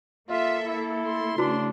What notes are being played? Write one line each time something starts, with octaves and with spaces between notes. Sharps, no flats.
A#3 F4 A4 E5
E4
C6
C#3 A3 D4 E4 F#4 B4